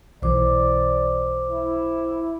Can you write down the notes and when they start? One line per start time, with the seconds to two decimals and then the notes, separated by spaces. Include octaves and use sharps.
0.22 B1 E3 C5 D5 D6
1.49 E4